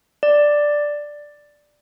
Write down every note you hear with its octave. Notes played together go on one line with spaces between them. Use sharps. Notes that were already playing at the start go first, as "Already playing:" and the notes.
D5